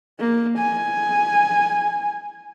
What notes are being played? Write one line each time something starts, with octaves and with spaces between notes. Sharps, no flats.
A#3
G#5